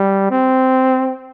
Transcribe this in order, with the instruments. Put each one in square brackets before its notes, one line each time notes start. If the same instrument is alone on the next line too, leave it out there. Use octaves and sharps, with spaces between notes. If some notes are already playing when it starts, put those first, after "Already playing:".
Already playing: [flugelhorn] G3
C4